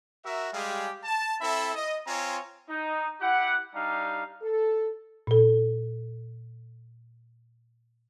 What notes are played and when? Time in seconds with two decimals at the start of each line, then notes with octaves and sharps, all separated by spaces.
0.24 F#4 A#4 E5
0.53 G3 G#3 G4 G#4 F5
1.04 A5
1.40 C4 E4 A4 E5 B5
1.75 D#5
2.07 C4 F4 C#5 G#5 A#5
2.69 D#4
3.21 E4 G4 F#5
3.74 G3 D4 D#4 G4 F5
4.42 A4
5.27 A#2 A4